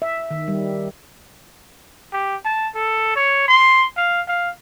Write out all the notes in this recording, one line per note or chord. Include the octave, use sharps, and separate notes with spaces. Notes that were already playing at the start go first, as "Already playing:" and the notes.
E5
D#3
G3
G4
A5
A4
C#5
C6
F5
F5